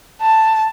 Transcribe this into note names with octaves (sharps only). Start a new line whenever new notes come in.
A5